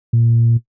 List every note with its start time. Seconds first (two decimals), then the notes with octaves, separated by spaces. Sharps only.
0.13 A#2